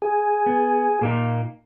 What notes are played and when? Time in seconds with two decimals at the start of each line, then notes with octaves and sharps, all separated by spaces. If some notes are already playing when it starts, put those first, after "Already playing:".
0.02 G#4
0.46 B3
1.01 A#2 A#3 D#4